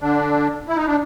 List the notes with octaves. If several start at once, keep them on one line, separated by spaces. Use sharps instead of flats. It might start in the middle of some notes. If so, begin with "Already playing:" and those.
D3 D4
E4
D#4
D4